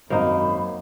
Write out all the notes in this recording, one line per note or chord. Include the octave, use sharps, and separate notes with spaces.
G#1 F#2 A#3 D#4 F#4 C5 B5